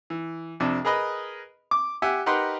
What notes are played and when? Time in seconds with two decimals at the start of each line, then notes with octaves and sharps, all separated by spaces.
0.10 E3
0.60 F2 C3 D4
0.85 G#4 A#4 B4 D#5 B5
1.71 D6
2.02 G4 E5 F#5 G#5
2.26 D#4 G4 A#4 B4 F#5 C6